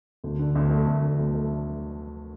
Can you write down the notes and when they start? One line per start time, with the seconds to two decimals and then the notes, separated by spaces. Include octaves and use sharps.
0.24 D2
0.39 D3
0.55 D2
0.71 A3
0.87 D2
1.02 D3
1.19 D2
1.35 A3